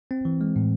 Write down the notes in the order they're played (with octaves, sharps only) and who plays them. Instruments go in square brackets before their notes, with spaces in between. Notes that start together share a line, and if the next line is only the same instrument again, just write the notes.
[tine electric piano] C4
E3
G#3
A2